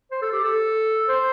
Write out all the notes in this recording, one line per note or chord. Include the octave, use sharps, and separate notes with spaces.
C5
A4
G4
A4
C5